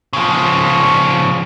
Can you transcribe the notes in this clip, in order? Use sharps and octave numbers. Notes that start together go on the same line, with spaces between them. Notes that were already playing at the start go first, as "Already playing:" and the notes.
C#3 F3